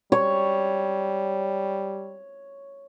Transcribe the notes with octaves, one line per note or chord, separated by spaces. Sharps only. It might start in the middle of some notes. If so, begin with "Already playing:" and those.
G3 C#5